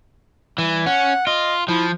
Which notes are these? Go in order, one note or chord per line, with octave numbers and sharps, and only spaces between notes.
E3 G3
C#4 F#5
F4 D#5
F3 E4